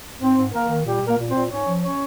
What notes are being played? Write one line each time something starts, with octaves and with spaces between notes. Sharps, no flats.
G#2 C4 C5
G#2
D#3 A#3 A#4
D#3
A#2 G3 G4
A#2
A#3 A#4
A#2
C4 C5
A#2
G#2 C#4 C#5
F3
C#4 C#5